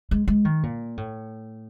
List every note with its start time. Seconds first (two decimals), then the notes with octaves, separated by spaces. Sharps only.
0.11 G#3
0.28 G#3
0.45 D#3
0.63 A#2
0.97 A2